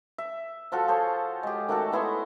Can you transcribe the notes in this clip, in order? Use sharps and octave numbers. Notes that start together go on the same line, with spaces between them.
E5
F3 F4 F#4 A4
G#4 A4 C5 C#5
G#3 G4
D#3 A3 F#4 A4
B3 E4 G#4 C6